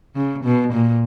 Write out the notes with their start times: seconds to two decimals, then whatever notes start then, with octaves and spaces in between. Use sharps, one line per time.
0.16 C#3
0.44 B2
0.73 A#2